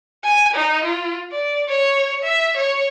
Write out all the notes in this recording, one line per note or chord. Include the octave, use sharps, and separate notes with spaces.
G#5
D#4
F4
D5
C#5
E5
C#5